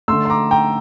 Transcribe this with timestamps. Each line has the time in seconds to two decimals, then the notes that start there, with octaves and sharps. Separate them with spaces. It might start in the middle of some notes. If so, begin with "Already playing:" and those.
0.08 D3 A3 C6 E6
0.25 C6
0.30 A#5 D6
0.51 G5 A#5